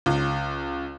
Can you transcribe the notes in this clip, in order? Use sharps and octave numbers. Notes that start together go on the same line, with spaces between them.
C#2